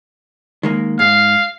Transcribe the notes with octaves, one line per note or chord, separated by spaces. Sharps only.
D#3 G#3 A#3
G#2 F5